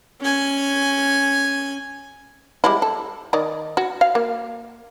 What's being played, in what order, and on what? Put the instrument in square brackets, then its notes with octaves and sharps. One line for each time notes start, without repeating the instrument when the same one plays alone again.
[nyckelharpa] C#4 G#5
[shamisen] G3 G#3 E4
A4
D#3 D5 D#5
F#4
F5
A#3